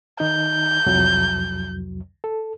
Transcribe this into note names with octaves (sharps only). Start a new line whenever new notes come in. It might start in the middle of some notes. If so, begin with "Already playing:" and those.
D#3 D#4 G6
C2 F2 F#3
A4